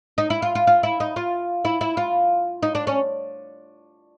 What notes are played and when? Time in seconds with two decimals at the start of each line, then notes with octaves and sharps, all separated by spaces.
0.18 D#4
0.30 E4
0.42 F4
0.55 F4
0.67 F4
0.83 E4
1.00 D#4
1.16 F4
1.65 E4
1.81 E4
1.97 F4
2.63 D#4
2.75 D4
2.87 C#4